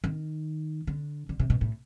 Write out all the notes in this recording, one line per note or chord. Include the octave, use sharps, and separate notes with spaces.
D#3
D3
D3
C3
B2
A2